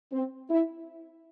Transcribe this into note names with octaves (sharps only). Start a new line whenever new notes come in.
C4
E4